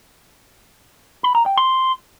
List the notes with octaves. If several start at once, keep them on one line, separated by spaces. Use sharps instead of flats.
B5
A#5
G5
C6